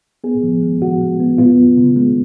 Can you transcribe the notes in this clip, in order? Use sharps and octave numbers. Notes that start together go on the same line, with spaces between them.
B3 G#4
F3
G#3
F3 F#4
G#3
B3
B3 F4
F#2
C#3
G#3